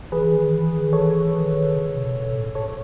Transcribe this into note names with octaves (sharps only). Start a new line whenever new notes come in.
E3 G#4 B4
D#3
E3
D#3
E3 A4 C#5
D#3
C#3
B2
B2
A2
A4 C#5